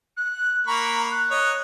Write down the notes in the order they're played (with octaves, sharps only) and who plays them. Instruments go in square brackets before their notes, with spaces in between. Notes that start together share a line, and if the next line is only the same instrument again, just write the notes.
[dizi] F#6
[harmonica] A#3 B5 C#6 [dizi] A#5
[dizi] F#6
[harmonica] C#5 D#5